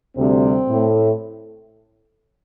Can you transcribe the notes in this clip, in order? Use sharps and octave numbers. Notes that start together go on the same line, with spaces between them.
D2 C3 G3 C4
A2
A3